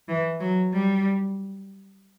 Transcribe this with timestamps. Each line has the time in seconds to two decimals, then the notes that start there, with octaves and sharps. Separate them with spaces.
0.09 E3
0.41 F#3
0.73 G3